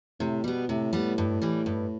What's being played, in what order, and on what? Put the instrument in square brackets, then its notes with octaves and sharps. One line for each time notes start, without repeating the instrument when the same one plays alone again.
[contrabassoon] A2 [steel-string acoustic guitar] C3
[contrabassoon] B2 [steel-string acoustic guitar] G3 B3
[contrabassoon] A2 [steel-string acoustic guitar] C3
[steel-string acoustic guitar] G3 B3
G2
E3 G3
G2